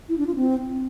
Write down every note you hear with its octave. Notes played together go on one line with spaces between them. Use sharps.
E4
D4
F4
C4